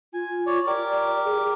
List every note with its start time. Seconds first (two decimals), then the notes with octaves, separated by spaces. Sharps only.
0.14 F4 G#5
0.46 C#5 D5
0.67 G4 A#4 D5 D6
1.25 G#4
1.41 G#4